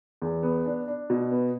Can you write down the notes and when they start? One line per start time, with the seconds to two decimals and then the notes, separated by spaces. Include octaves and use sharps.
0.22 E2
0.43 B3
0.66 D4
0.88 D4
1.10 B2
1.31 B3